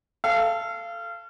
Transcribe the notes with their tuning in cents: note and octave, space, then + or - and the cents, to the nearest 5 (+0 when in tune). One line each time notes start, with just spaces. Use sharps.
A4 +0 F5 -25